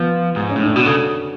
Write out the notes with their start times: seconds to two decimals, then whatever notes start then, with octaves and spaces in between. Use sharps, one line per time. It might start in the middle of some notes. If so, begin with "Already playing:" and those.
Already playing: F3 B3
0.36 G#2
0.50 C#4
0.56 A2
0.63 D4
0.76 B2 F#4
0.86 C#3 A4